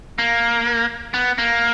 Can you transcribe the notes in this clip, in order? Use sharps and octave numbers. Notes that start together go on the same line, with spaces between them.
A#3
B3
A#3